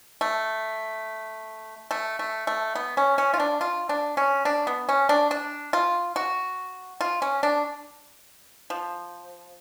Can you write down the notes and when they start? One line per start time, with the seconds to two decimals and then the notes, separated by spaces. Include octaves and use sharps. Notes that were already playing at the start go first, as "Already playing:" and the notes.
0.21 A3
1.91 A3
2.19 A3
2.47 A3
2.75 B3
2.97 C#4
3.18 C#4
3.34 F4
3.40 D4
3.61 F4
3.89 D4
4.17 C#4
4.45 D4
4.67 B3
4.89 C#4
5.09 D4
5.31 D4
5.73 F4
6.16 F#4
7.01 F4
7.22 C#4
7.43 D4
8.70 F3